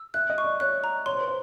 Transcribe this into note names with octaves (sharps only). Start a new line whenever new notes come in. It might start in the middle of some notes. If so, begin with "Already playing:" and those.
Already playing: E6
E5 F#6
D#5
C#6
D5
C#5 F#6
A#5
C#5 C6
C5
B4
C5